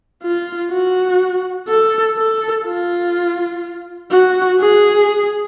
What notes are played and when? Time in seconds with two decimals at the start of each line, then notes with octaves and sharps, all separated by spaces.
0.23 F4
0.72 F#4
1.68 A4
2.18 A4
2.66 F4
4.12 F#4
4.60 G#4